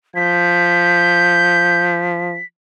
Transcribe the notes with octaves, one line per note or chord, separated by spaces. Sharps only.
F3 G6 B6